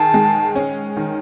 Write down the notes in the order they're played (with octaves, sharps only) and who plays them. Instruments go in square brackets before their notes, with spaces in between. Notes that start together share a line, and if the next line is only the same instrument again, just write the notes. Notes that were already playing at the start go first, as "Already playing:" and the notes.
Already playing: [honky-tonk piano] D#3 G#4 [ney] A5
[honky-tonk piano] G#3
C#4
D#3